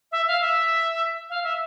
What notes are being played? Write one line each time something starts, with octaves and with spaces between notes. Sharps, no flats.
E5
F5
E5
F5
E5